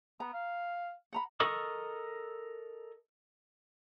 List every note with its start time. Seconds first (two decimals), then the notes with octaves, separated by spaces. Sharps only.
0.20 B3 A#5
0.33 F5
1.13 F#5 A#5 B5
1.40 A4 A#4 D#5 C#6 D#6